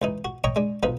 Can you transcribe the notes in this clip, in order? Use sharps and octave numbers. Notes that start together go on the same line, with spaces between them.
C#2 E3 D#4
F#4
C#5 D#5 G5 A#5 C#6
G#3 D4
B1 F3 D#4 B4